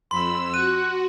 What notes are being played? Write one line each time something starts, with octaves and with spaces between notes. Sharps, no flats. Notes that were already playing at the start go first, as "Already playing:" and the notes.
F2 B5 C6 E6
F#4 F#6 D#7